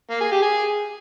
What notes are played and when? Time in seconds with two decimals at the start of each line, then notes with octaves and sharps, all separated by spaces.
0.10 A#3
0.21 G#4
0.31 G4
0.42 G#4